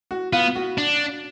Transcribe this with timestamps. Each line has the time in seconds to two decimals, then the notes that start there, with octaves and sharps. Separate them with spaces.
0.11 F#4
0.33 B3 F4
0.55 F#4
0.78 D4